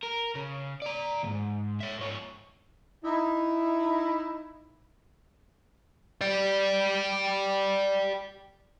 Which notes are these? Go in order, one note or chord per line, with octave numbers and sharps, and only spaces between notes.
A#4
C#3
D5 A#5
D2 G#2
C#5 E5
G#2 C#5
D#4 E4
D5 G5